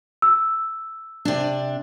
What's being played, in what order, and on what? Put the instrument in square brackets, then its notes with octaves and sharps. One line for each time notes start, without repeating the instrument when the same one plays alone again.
[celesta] E6
[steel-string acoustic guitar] C3 D4